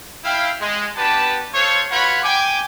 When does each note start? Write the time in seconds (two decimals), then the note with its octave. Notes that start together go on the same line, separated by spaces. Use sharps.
0.24 E4 F5 G5
0.61 G#3
0.97 B3 D4 G4 B4 A5
1.53 F4 A4 C5 C#5
1.91 F4 F#4 B4 C#5 F#5 B5
2.23 G5 G#5 D6